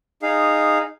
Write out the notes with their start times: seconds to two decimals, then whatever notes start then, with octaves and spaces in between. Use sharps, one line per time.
0.22 D#4 G#4 F5